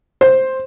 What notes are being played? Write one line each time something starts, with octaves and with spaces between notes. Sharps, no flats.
C5